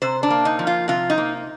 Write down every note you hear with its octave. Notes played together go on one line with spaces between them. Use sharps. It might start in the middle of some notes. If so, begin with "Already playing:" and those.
C3 C5
D4
A#3
D#4
F3
F4
C3 F4
D#4
A#3